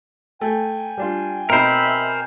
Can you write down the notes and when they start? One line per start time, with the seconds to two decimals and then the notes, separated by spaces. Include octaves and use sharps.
0.41 A3 G5 G#5
0.98 G3 D4 F4
1.50 B2 C4 D#4 A#4 C5 E5 B5